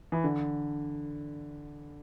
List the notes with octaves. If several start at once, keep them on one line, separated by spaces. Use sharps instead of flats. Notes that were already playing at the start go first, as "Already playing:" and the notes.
E3
D3